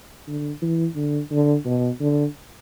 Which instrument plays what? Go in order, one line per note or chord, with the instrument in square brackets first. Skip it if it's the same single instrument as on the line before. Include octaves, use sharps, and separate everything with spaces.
[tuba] D3
E3
D3
D3
B2
D3